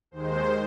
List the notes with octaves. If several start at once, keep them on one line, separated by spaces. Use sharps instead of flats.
D#2 D#3 G#3 C5